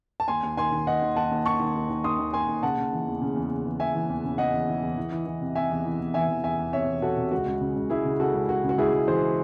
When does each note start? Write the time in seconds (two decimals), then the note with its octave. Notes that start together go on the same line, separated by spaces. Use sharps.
0.20 A5
0.28 D#2 G#5 C6
0.43 D#2
0.57 D#3 G#5 C6
0.72 D#3
0.87 D#3 D#5 F#5
1.02 D#2
1.16 D#2 F#5 A5
1.31 D#2
1.46 D#3 A5 C#6
1.60 D#3
1.75 D#2
1.90 D#3
2.04 D#3 C6 D#6
2.19 D#2
2.33 D#2 G#5 C6
2.48 D#2
2.63 C#3 F#5 A5
2.78 C#3
2.93 E3
3.07 E2
3.21 C#3
3.36 E2
3.51 C#3
3.65 E3
3.80 E2 E5 G#5
3.95 E3
4.09 E2
4.24 C#3
4.38 C#3 D#5 F#5
4.53 E2
4.68 E3
4.83 E2
4.98 E3
5.12 E3
5.27 E3
5.41 C3
5.55 C3 E5 G#5
5.71 E2
5.85 E3
6.00 E2
6.14 E3 E5 G#5
6.29 E3
6.44 E2 E5 G#5
6.59 E2
6.73 C3 C#5 E5
6.88 E2
7.02 C3 F#4 A4
7.17 C3
7.31 C#2 F#4
7.46 C#2
7.61 C#3
7.76 C#2
7.90 C#2 E4 G#4
8.05 C#3
8.20 C#3 F#4 A4
8.34 C#2
8.49 C#3 F#4
8.64 C#3
8.69 F#4
8.78 C#2 E4 G#4
8.93 C#2
9.08 E3 G#4 C5